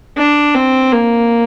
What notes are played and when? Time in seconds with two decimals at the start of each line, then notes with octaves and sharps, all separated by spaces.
0.17 D4
0.55 C4
0.92 A#3